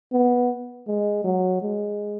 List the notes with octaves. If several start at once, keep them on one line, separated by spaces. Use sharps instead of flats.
B3
G#3
F#3
G#3